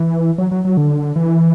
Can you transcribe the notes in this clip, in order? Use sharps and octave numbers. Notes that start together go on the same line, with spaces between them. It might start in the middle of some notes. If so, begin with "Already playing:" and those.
Already playing: E3
F#3
F#3
F#3
D3
E3